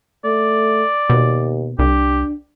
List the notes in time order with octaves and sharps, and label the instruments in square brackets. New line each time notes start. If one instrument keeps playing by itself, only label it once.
[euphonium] A3 [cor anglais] D5
[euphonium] D#2 [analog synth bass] B2
[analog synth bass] C2 [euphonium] D4 [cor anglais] G4